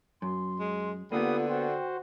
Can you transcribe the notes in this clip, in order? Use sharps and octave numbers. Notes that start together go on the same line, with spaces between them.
F#2 C6
G#3
D3 A#3 B3 F4 G4 B4 D#6
F#4 C5 G5